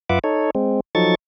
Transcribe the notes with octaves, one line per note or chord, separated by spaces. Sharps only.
F#2 F4 B4 E5 F#5 D6
D#4 A4 C#5
G#3 C4
F3 F#3 D#4 A4 C#6 A6